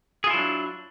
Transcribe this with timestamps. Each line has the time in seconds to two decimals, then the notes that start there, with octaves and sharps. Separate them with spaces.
0.24 G#4
0.27 F4
0.30 E4
0.34 F#3
0.37 D4